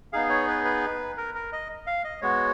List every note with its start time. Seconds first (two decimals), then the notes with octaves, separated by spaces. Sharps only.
0.13 B3 D#4 G#4 F5
0.30 C#5
0.48 B4
0.65 B4
1.17 A#4
1.35 A#4
1.52 D#5
1.87 F5
2.04 D#5
2.22 G#3 B3 F#4 C#5